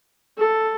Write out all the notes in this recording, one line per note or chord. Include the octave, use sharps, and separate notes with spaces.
A4